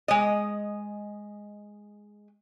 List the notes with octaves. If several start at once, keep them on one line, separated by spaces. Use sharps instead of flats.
G#3 D#5